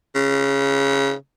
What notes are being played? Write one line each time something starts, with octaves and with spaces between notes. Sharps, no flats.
C#3